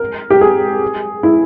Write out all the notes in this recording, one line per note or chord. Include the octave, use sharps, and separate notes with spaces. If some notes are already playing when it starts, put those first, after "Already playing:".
Already playing: A#4
G4
G#4
E4